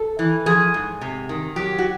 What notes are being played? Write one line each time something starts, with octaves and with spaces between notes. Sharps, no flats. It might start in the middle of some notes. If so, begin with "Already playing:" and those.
Already playing: A4
E3
F3 G#4
G#2
C3
D#3
F#3 G4
F#4